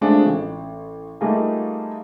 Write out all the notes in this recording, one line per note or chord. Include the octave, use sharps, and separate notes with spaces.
G#3 A3 C4 D4 F4 G#4
A1
G3 A3 A#3 D#4 F4 G#4